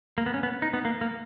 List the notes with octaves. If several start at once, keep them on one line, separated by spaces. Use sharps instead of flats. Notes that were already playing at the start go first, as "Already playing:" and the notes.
A#3
B3
C#4
B3
D#4
B3
A#3
A#3